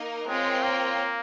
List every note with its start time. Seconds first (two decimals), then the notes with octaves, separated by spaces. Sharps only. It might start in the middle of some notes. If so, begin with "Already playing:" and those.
Already playing: A#3 D#4 A#4
0.27 G#3 C4 F4 A#4 C#5 G5
0.63 A#3